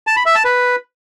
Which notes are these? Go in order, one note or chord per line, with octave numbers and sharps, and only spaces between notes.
A5
B5
E5
A5
B4